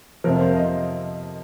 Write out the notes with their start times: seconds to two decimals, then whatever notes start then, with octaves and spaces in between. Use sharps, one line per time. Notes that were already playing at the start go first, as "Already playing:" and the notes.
0.24 F2 C3 F3 A#4
0.40 C5
0.56 D#5